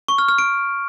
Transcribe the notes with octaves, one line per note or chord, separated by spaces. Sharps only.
C#6
F6
F6
D7